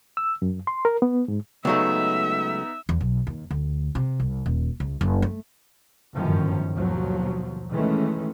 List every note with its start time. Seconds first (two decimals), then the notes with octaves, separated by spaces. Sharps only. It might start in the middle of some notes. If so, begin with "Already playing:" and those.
0.17 E6
0.42 F#2
0.67 C6
0.85 A#4
1.02 B3
1.28 G#2
1.65 C#2 F#3 A3 B3 D#4 E5
2.89 E2
3.01 B1
3.27 D#2
3.51 D2
3.95 C3
4.20 C2
4.46 D#1
4.80 C#2
5.01 F#1
5.22 A3
6.14 G1 F#2 A2 D#3 F3 C#4
6.72 G1 D#2 B2 F3 F#3
7.70 D#3 E3 G#3 A3 C#4